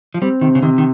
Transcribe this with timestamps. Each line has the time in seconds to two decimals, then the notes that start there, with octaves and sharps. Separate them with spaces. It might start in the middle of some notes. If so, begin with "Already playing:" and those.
0.14 F3
0.22 G3 C4
0.41 C3 D#3
0.55 C#3
0.62 C3 D#3
0.78 D#3